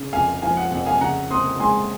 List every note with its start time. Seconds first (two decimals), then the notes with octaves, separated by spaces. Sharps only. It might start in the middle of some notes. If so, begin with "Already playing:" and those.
Already playing: C#3
0.13 F2 F5 G#5
0.42 F3 F5 G#5
0.57 F#5
0.72 F2 F#5
0.86 F5 G#5
1.01 C#3 F#5 A#5
1.30 C4 C6 D#6
1.60 G#3 G#5 C6